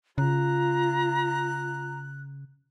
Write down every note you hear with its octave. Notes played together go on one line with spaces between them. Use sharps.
C#3 F4 A#5 F#6